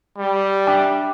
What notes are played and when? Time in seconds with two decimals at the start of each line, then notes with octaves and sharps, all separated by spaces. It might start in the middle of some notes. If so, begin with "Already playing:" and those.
0.18 G3
0.66 D4 E5 G5